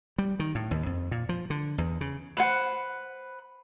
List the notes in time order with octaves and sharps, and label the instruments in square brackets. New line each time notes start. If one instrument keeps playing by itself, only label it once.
[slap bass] G3
D#3
A2
D#2
F2
A#2
F3
D3
E2
C#3
[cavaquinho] B4 C5 F#5